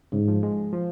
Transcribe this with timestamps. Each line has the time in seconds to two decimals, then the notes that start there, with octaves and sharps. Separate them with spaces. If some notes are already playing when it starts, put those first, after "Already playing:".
0.12 G#2 C#3
0.28 F3
0.43 G#3
0.73 F3